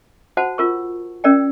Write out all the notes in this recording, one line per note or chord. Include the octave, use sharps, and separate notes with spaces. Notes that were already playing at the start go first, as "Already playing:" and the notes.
F#4 C5 F#5 A5
F4 A#4 C#6
C#4 A#4 D5 G5